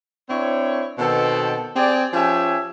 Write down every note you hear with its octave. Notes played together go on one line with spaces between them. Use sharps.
C4 D4 E4 C#5
B2 D#3 B3 C4 A4
C4 G4 G#4 D5
F3 C#4 G4 G#4 E5